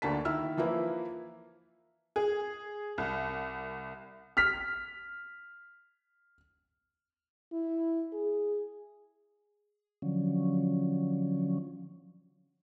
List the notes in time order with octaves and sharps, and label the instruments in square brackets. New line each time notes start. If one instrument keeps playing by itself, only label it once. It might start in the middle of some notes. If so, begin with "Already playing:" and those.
[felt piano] D2 D3 A#3 A5 B6
D#3 E4 E6 F6
E3 F3 A#3 E4 B4
[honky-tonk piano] G#4
C2
[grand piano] F6 B6
[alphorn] E4
G#4
[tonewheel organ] D3 F3 F#3 C#4